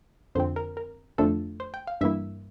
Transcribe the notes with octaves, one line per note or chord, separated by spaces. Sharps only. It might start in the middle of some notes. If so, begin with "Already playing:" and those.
F2 D3 F3 C4 C5
A#4
A#4
F2 D3 F3 A3 D4 A4
C5
G5
F5
G2 E3 A#3 E4 E5